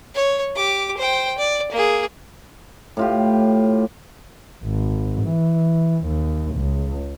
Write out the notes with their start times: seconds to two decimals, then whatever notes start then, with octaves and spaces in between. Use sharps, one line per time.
0.14 C#5
0.56 G4 D6
0.97 C5 G5
1.38 D5
1.72 A#3 G#4
2.97 A2 F4 G4
4.63 G#1
5.23 E3
6.05 D#2
6.55 C#2